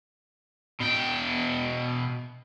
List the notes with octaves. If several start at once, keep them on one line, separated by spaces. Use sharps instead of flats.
B2 G5